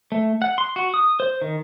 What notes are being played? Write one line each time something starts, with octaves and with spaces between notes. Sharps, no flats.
A3
F#5
C6
F#4
D#6
C5
D#3